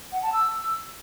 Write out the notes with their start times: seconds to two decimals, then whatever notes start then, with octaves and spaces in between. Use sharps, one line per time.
0.12 F#5
0.22 A5
0.33 E6